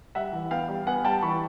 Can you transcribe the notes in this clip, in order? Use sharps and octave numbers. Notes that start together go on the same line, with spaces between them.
G3 E5 F#5
E3
B3 F5 G5
G3
B3 F#5 G#5
G3 G5 A5
E3 B5 C#6